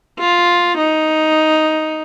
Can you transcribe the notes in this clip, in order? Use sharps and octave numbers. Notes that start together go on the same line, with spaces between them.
F4
D#4